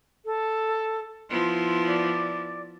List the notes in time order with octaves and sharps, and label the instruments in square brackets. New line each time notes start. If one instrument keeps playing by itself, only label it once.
[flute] A4
[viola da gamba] F3 B3 E4 [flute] C6
[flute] D5